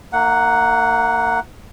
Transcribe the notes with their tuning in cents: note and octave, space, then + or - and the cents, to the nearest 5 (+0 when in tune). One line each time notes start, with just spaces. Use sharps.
A#3 -40 D#4 -5 F#5 +0